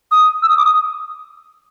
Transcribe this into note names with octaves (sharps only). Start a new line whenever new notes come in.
D#6
E6
D#6
D6
D#6